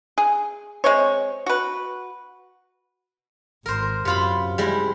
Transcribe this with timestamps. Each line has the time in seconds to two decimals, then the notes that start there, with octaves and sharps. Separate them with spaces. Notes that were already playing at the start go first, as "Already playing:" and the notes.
0.18 G#4
0.84 G#3 C4 C#5
1.46 F#4 B4
3.66 G#1 A#4 C5
4.05 F#2 C3 F4 B5
4.58 G3 G#3 E4